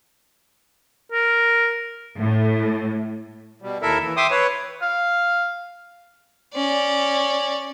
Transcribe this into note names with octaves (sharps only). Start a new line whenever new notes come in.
A#4
A2
B2 G3
D#2 E4 A4 A#4 E5
E3
E5 G5 C6 D6 D#6
B4 C#5
F5
C#4 D5